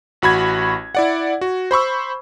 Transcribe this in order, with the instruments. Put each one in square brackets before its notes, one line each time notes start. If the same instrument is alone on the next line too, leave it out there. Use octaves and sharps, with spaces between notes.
[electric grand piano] A1 F#4 B5 G#6
E4 D5 F#5
F#4
C5 B5 C#6 E6